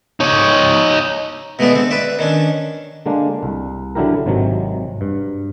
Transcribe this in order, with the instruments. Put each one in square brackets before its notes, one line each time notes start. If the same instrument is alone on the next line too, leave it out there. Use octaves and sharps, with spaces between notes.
[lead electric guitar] D#4 C#5
[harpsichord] B2 G#3 A3 B3 D5
D3 C4
B4 D5 E5
D#3 C#4 D4
[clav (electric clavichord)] D3 G#3 A#3 D4
C2
D3 F#3 D4 E4 G4 A#4
G#1 C3 D#3 F#3
G2